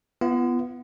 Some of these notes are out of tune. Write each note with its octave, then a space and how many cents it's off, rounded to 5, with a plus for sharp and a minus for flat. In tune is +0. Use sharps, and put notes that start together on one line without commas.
B3 +0 F4 -40